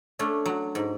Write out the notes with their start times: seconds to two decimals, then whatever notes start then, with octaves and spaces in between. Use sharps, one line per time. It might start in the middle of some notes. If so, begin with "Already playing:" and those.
0.19 A3 C#4 D4
0.46 F#3
0.75 G#2